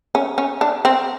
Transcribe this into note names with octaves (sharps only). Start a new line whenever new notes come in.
C#4
C#4
D4
C4